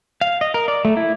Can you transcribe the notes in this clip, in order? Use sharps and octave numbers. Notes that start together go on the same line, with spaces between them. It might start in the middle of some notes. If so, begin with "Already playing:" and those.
F5
D#5
A#4
D5
A3
E4